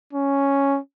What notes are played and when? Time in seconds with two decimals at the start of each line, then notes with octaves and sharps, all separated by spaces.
0.13 C#4